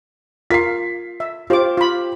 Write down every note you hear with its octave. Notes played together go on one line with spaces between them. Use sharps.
F4 A#4 B6 C7
E5
F4 G4 C5 D6
F4 B5